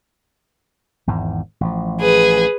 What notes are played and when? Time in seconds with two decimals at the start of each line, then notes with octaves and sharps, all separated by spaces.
1.07 G#1 E2 G#2
1.61 A1 F3
2.01 G#4 B4